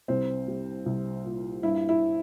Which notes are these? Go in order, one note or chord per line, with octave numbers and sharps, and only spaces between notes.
C2 C4
G3
C2
A#2
G2 E4
E4